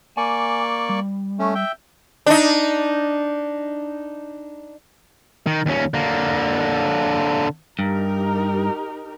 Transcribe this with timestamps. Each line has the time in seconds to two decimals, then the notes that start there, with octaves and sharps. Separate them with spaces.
0.17 A#3 D5 G#5 C#6
0.89 G3
1.39 A3 C#4
1.55 E5 G5
2.26 D4 D#4
5.47 D#3
5.66 D#2 C#4
5.94 D3 A#3
7.79 G2 D#4 G4 A#4